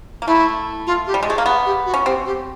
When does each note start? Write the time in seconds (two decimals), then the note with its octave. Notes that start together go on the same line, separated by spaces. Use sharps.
0.22 A#3
0.27 A3 E4
0.87 F4
1.07 G4
1.14 G3
1.23 G#3
1.27 G#4
1.30 A3
1.38 A#3
1.46 B3
1.65 G4
1.86 F#4
1.94 C#4
2.06 C4 G4
2.26 G4